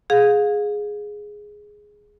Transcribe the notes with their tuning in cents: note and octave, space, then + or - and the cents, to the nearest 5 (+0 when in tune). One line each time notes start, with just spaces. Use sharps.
G#4 +0 F5 +25